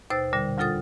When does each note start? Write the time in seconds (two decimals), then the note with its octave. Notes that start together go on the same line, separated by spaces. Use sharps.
0.10 D#2 B2 C5 E6 A6
0.33 A#2 D3 G3
0.58 D2 G3 F4 A4 D#6 A6